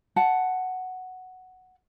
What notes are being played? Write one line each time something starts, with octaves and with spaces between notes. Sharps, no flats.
F#5 A5